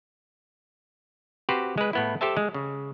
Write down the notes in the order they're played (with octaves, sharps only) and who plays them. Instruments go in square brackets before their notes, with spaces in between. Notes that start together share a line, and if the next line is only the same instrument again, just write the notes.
[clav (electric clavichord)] C4 F#4 G4 B4 C5
G#3 B4
A2 B3 E4
G4 A4 C5 E5 A5
G#3
C#3